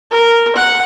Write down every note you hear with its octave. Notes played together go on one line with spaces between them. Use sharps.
A#4
F#5